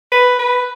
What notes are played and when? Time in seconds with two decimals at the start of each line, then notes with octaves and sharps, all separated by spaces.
0.12 B4
0.39 B4